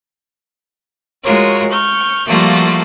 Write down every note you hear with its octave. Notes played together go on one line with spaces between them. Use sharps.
G#3 F4 F#4 A#4 C#5
C#6 F6 G6
F3 G3 A3 A#3 F4 F#4